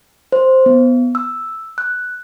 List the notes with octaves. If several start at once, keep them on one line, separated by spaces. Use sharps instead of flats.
C5
B3
E6
F#6